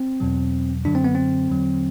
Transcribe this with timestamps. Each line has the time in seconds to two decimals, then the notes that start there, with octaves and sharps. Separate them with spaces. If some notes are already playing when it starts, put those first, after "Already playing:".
Already playing: C4
0.20 E2 B2 F#3
0.85 F#2 D3 F#3 D4
0.95 C4
1.04 B3
1.15 C4
1.49 E2 D3 F#3